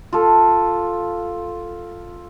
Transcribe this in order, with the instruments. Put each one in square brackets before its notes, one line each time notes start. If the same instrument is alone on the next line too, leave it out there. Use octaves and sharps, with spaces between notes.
[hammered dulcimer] F4 A4